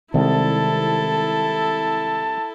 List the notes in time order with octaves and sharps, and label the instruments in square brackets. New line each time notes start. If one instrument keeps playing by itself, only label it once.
[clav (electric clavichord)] C2 [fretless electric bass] C3 D#3 G#3 [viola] E4 A4 [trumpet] A5